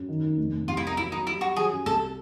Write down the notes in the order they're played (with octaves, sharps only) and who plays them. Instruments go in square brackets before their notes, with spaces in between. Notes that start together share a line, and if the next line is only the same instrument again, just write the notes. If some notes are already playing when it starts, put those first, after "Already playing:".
Already playing: [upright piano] F#2
D#3
D#3
F1
F1
[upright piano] C2 [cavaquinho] F4
[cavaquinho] E4
[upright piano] A#3 [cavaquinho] D#4
[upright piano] F#3 [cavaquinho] E4
[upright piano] F#3 [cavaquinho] D#4
[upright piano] G3 [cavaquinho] E4
[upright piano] G3 [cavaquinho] F#4
[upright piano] F#3 [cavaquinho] G#4
[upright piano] F#2
[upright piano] C2 [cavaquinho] A4